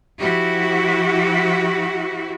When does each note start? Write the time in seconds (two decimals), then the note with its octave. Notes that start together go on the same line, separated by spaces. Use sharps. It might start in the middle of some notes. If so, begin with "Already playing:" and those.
0.19 F3 E4 F#4 G4